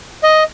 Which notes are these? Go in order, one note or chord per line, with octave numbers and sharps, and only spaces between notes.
D#5